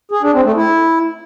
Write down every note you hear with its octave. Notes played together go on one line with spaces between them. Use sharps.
G#4
D4
C4
A3
E4